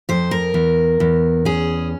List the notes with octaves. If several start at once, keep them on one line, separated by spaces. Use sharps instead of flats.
F2 C5
A#4
E2
E2
C#4 G#4